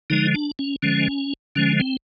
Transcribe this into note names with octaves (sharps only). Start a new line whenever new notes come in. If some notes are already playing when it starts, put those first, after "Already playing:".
D3 F3 G#3 D#4
D4
C#4
D3 F3 G#3 C#4
D3 F3 G#3 C#4
C4